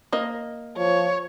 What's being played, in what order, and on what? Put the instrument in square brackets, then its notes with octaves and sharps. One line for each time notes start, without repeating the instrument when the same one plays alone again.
[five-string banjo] A#3 D#5
[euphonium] F3 [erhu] C#5